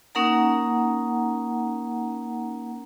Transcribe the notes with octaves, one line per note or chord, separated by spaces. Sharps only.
A#3 C#4 D#4 A#4 F#5 A#5